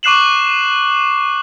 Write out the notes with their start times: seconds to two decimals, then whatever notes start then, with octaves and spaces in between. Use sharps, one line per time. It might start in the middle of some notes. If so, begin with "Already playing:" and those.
0.03 C#6 D6 F#6 C7 E7 F#7